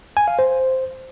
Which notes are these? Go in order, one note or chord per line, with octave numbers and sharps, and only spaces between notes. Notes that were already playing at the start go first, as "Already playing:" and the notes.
G#5
F5
C5